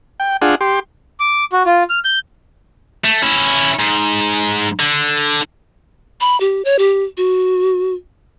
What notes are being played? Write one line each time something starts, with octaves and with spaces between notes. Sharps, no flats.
G5
D4 F4 G#4 F#5
G4 C6
D6
F#4
F4
F6
G6
A3
C#4 E4
G#2
D3
B5
G4
C#5
G4
F#4